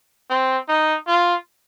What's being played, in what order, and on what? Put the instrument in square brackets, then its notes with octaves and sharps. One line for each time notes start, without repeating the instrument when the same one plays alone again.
[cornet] C4
D#4
F4